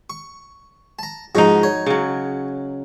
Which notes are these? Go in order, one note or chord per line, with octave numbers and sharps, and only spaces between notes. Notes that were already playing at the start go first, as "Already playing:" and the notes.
C#6
A5 A#5
G#2 F3 G#3 D#4 F#4
C#5
C#3 F#3